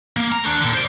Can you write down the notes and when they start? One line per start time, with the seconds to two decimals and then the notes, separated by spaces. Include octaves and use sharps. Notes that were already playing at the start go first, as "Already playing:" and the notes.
0.17 A#3
0.32 A#5
0.44 A3 D4
0.60 A#2 D3
0.74 C5 D5